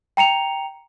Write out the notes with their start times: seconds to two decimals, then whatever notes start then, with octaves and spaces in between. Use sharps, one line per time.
0.17 G5 A#5 C#7 F7